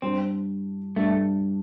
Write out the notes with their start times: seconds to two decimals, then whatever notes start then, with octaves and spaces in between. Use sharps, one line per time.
0.02 G2 G3 C4 D4
0.96 G2 G3 A3 D4